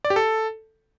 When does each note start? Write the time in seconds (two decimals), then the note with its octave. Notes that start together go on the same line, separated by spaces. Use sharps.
0.05 D5
0.10 G4
0.16 A4